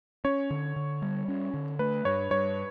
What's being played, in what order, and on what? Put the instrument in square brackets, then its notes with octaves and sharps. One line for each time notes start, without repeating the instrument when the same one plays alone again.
[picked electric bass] C#4 [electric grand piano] C#5
[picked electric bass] D3
D3
G3
C#4
D3
[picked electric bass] A3 [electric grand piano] B4
[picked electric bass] G2 [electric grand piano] C#5
[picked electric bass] G2 [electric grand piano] C#5